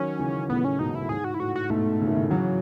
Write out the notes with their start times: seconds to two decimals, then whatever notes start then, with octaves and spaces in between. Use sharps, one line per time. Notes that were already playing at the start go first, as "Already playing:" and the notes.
Already playing: D#3 F#3 C#4
0.19 C#3 E3
0.50 A2 C#3 B3
0.64 C#4
0.79 G#2 B2 D#4
0.91 B2 E4
1.00 A2
1.09 G#2 G#4
1.24 F#4
1.34 E4
1.39 A2 F#4
1.56 F#4
1.70 G#2 B2 A3
2.00 C#3
2.07 D#3
2.15 A2 C#3
2.30 C#3 E3 F#3